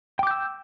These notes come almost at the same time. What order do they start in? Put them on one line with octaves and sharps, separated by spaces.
G5 D6 G6 E6